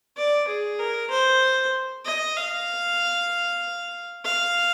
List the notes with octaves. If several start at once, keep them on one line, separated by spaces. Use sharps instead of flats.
D5
G#4
A#4
C5
D#5
F5
F5